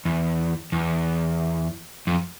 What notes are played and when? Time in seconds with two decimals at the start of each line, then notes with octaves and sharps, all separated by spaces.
0.05 E2
0.72 E2
2.07 F2